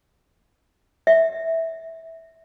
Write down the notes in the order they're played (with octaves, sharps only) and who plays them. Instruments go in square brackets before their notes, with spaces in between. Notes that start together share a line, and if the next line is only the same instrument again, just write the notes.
[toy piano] E5